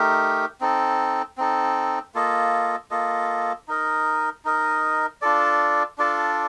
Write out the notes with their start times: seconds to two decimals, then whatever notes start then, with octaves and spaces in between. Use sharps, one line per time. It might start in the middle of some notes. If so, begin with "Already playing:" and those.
Already playing: A3 D#4 G4 A#4
0.61 C4 D#4 A4
1.38 C4 D#4 A4
2.15 A#3 F4 A4 D#5
2.91 A#3 F4 A4 D#5
3.68 D#4 A#4 D#5
4.45 D#4 A#4 D#5
5.22 D4 F4 A4 D5
5.98 D4 F4 A4 D5